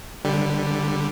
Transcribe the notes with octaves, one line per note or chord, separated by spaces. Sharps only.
D3 G3